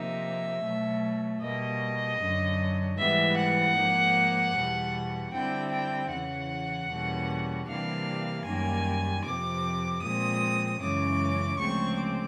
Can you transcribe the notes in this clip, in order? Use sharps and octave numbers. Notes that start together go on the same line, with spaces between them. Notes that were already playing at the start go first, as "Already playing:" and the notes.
Already playing: C3 F3 A#3 D#4 E5
B2 F#3 A3
B2 G3 A#3 D#5
F#2 D3 F#3
G#2 E3 G3 B3 E5
F#5
G#2 F3 A#3 D#4
E2 B2 G3
D3 G3 C4 E4 G5
G5
E2 C#3 E3 F#5
E2 B2 G3 A#3 C#4
C3 E3 G3 A#3 D4 F5
F#2 D#3 G3 A#3 G#5
F2 C3 F3 D6
A#2 F3 G#3 C4 D#6
F#2 C#3 E3 G#3 C#4 D6
D2 C#3 F3 G#3 C4 C#6
D6